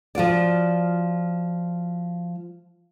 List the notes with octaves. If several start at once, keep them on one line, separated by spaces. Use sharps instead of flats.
F3 F4 F#4 D5